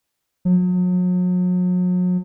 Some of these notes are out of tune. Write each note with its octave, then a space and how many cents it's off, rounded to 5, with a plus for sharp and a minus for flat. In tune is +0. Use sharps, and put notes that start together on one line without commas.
F#3 -40